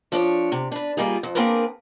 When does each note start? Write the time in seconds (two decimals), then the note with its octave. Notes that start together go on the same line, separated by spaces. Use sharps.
0.12 F3 D4 C#5
0.52 C3
0.72 D4 B4
0.97 G3 A#3 D#4 F4 G#4
1.23 F2
1.35 A#3 C4 D4 G#4 A#4 B4